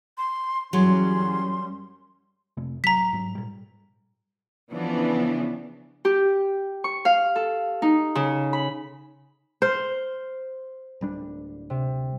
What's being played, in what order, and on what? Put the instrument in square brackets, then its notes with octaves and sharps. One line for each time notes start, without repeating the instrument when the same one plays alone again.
[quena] C6
[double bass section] F#2 G3 C#4 [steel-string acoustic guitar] E3 F#3 G#4 [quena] C6
[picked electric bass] F2 C3 A3
[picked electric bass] D1 G1 F#3 [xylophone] A#5 B6
[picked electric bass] G#2 F#3
A#2 G3
[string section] C#3 E3 F3 B3 D4
[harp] G4
C#6
F5
A4
D#4
C#3
B5
[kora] C5 [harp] C6 F6
[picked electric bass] D1 G3 D4
[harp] C3